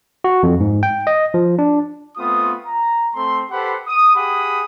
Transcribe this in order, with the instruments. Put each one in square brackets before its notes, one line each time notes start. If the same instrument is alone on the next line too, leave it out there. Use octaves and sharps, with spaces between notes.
[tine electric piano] F#4
F2
G#2
G5
D#5
F3
D4
[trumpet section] A3 B3 C4 F4 D#6
A#5
A3 C4 A4 C6
G4 A4 B4 C5 F#5 B5
D#6
G4 G#4 F#5 G5 B5 D#6